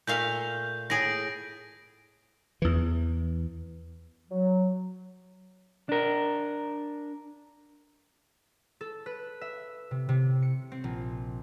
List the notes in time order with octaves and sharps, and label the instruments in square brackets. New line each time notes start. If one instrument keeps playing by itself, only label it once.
[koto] A#2 A3 F5 [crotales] G6
[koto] A2 G#4 [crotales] A#6 D7
[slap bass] E2 E3
[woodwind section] F#3
[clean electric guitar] D4 A#4
[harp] A4
B4
E5
C3
C3
C#7
C4
A#1